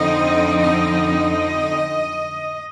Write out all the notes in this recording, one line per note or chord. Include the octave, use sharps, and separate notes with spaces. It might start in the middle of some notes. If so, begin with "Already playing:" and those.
Already playing: F2 D3 F3 C4 D#4 D#5
D#5